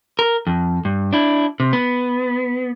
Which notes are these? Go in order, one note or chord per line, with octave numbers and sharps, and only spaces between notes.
A#4
F2
G2
D4 E4
C3
B3